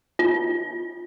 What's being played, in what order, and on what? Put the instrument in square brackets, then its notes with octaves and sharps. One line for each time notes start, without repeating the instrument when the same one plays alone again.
[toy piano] F4